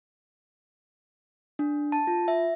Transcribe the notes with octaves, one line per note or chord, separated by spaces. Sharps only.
D4
A5
F4
E5